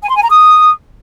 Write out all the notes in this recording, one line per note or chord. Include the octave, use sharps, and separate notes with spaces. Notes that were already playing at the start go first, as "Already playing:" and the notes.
G#5
C6
G#5
A#5
D#6